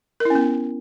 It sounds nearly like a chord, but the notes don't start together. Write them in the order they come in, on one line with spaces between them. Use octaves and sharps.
A#4 E4 C#4 B3